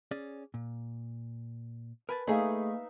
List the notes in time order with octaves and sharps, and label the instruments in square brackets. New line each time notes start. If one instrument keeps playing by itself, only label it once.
[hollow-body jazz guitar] C#4 G#4 D5
A#2
[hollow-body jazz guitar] A#4 G#5 A5 [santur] B4
[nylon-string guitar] A3 G#4 [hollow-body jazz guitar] A#3 [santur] D#4 E5 F5